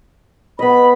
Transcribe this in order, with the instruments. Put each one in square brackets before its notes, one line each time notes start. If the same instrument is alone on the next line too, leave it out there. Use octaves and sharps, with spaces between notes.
[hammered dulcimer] B3 D#5 [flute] B5